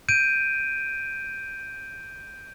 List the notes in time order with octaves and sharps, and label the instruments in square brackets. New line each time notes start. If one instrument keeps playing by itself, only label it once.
[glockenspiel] G6 D7 D#7